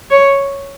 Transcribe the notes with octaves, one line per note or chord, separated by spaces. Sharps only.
C#5